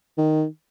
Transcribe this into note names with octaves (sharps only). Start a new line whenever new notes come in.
D#3